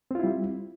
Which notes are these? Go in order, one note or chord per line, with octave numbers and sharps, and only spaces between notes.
G3 C4 E4 F4